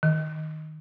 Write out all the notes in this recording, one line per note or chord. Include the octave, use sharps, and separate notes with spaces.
D#3